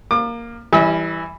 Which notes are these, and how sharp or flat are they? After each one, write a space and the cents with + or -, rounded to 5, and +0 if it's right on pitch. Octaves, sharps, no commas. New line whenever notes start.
A#3 +0 D6 +35
E3 +0 G3 +0 E5 -40